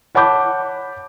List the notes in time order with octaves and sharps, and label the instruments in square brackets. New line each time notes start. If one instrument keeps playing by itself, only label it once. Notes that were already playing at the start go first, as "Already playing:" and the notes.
[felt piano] C#5 F#5 A5 B5 D6 G6